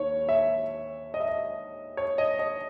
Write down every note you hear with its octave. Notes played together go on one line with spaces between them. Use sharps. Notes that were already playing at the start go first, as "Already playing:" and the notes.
Already playing: D#2 D#3 C#5
E5
D#5
E5
D#5
C#5
D#5
D#5